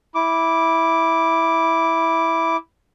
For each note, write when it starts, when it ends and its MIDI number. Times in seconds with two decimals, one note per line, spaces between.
0.15 2.57 64
0.15 2.57 86